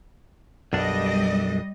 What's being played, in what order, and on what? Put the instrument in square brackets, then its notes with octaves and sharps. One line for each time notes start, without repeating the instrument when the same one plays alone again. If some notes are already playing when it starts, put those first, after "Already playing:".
[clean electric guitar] B1 F#2 D4 [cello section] G3 D#5